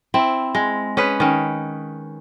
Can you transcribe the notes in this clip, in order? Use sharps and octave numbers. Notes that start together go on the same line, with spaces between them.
C4 E4
G#3
C#4 G#4 B4
D#3 C#4